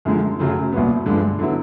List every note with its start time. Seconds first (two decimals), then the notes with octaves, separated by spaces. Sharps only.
0.05 F#2 D3 F3 G#3
0.39 F#2 C#3 F#3 A3
0.72 C2 A#2 F#3 B3
1.06 G2 D3 F3 G#3
1.39 D3 F#3 B3 E4